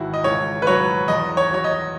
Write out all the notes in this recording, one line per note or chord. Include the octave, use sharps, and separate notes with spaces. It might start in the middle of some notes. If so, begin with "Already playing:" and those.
Already playing: G#1 E3 E4 F#4
D#5
C#2 C#5
B4
F#3 C#5
E2 D#5
C#5
F#3 C#5
D#5